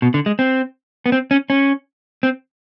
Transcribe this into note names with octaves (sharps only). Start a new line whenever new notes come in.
B2
D3
G#3
C4
B3
C4
C#4
C#4
C4